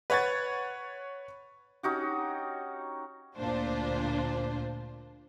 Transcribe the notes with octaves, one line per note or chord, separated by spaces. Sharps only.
B4 C#5 F#5 G#6 A6
C#4 D#4 F#4 G4
D2 A#2 D4 F4 C5